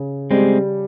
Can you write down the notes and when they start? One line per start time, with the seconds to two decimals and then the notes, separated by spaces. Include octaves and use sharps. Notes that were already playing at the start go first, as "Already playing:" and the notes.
Already playing: C#3
0.31 G3 G#3 C4